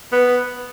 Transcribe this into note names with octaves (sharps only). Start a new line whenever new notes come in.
B3